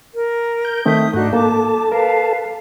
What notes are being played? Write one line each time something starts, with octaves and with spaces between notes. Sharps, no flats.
A#4
G6
D#3 A3 C4 E5 D#6
G#2 A3 D4 D#4 F#4 F#6
A#3 A4 A5 D6
A#4 B4 F5